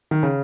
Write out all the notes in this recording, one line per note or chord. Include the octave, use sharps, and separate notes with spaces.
D#3
C#3